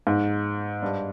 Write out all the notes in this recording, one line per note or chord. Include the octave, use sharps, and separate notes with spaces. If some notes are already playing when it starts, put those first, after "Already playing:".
G#2
G2